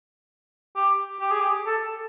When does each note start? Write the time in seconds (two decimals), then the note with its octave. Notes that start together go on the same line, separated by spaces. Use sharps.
0.76 G4
1.21 G4
1.31 G#4
1.41 G4
1.66 A4